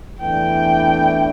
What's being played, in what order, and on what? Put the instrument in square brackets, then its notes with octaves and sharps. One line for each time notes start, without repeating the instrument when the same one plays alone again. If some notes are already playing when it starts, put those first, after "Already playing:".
[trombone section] E2 E3 A3 D4 [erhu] G5